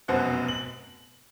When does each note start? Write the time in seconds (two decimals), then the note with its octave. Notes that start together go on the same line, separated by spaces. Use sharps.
0.08 F1 F#2 B2 C5 F#5
0.48 F#7